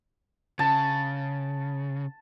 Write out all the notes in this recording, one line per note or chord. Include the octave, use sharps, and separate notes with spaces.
C#3 A5